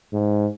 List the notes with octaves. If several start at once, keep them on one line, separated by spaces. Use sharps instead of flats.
G#2